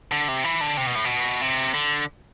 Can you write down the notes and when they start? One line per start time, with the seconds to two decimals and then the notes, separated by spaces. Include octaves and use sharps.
0.12 D3
0.28 C3
0.44 E3
0.61 D3
0.77 C3
0.86 B2
0.95 A2
1.05 B2
1.42 C3
1.74 D3